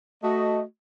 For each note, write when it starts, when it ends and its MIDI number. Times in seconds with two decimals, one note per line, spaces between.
0.23 0.61 57
0.23 0.61 66
0.23 0.61 75